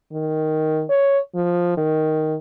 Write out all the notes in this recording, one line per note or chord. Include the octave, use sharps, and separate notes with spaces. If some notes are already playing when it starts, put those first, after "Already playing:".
D#3
C#5
F3
D#3